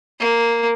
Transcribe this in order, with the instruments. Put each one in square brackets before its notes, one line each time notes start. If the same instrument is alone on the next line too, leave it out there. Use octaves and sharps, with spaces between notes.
[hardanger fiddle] A#3